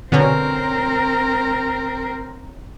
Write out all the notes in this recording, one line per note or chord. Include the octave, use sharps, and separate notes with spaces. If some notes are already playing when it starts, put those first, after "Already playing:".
B2 D3 C4 C#4 A#4